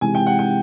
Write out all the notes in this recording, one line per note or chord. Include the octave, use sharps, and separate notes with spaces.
C3 E3 G#3 G#5
G5
F#5
G5